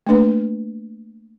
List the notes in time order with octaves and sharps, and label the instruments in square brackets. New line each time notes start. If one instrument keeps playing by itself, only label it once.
[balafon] A3 A#3 D4 B4